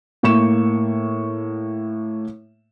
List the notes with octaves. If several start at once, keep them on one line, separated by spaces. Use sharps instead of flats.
A2 A#3 C#6 E7